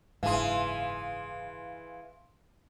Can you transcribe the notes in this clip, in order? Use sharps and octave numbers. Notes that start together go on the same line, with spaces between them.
F#1 G#2 E3 G#4 F5 C6